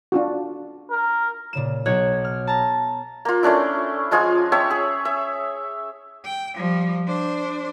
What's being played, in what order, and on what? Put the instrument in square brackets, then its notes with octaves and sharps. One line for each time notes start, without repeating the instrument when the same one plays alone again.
[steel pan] D4 F4 F#4
[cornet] A#4
[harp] A#2 C#3 E7
B1 C#5 F#6 G#6
F6
A5 A#5
[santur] A#3 F4
A3 C#4 D4 E4
F3 G#3 F4 G#5
C#5 E5 G5 A5
G#4
E5
[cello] G5
F3 G3
D4 C5